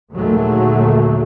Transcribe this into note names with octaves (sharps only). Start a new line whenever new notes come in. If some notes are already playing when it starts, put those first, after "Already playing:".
D#2 A#2 D3 F#3 G#3 A3